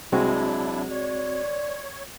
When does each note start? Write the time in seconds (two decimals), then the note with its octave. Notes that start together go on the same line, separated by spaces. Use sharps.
0.12 C2 F#3 G#3 C4 D4 E4 F#4
0.91 C#5 D5